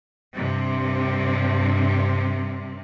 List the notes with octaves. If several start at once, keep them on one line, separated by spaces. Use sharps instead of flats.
G2 C3